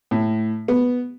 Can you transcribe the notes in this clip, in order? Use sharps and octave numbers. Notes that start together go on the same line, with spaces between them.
A2
B3